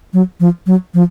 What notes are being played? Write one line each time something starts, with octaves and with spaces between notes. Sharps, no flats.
F#3
F3
F#3
F3